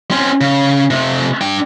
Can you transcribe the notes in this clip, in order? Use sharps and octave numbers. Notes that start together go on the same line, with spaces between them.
C4 C#4
C#3
C3 A3
D4 G5